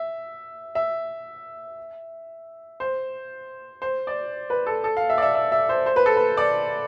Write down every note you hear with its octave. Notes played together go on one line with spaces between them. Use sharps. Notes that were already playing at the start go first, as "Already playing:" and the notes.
Already playing: E5
E5
C5
C5
D5
B4
A4
A4
F5
E5
D5
E5
E5
E5
C5
C5
B4
A4
B4
D5